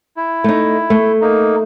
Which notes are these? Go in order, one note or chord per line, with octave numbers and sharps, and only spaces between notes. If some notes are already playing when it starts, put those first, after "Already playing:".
E4
A3 D#4
A3
A#3 D#4